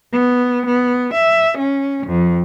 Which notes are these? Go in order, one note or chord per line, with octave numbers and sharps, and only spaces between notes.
B3
B3
E5
C#4
F2